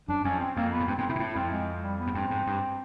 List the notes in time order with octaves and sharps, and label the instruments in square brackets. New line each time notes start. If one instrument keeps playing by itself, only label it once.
[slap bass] F#2 [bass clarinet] D4
[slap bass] F2 [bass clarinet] C#4
[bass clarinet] C4
[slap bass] F2 [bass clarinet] A#3
[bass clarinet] B3
[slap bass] G#2
[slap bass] G2 [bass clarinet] C4
[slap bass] G#2 [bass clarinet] C4
[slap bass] A2 [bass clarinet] E4
[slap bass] A#2
[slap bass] A2 [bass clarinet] E4
[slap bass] F2 [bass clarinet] C4
[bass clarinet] G#3
G3
B3
[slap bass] G#2
[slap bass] G2 [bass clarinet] C4
[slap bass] G#2
G2